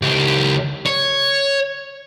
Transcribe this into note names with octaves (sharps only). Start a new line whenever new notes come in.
C#2 G4
C#5